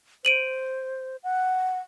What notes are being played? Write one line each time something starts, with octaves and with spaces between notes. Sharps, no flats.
C5 D7 D#7 F#7
F#5